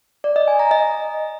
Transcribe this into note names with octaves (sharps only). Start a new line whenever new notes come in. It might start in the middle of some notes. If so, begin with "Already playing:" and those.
D5
D#5
G#5
A#5
D#5